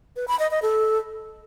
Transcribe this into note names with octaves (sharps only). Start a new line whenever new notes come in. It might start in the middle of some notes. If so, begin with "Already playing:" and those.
B4
B5
D#5
D#5
A4